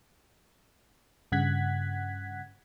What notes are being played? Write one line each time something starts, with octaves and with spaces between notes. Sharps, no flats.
G2 C#3 F#5 F#6 G#6 B6